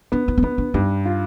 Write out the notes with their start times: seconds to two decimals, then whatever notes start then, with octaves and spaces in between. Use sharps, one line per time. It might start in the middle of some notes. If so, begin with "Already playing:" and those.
0.12 B3 D4
0.28 D#4
0.38 C4
0.42 B3 D4
0.58 D4
0.74 G2 D#4
1.06 F4